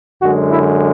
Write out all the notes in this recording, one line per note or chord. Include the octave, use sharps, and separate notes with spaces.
F#2 D3 G#3 F#4
E4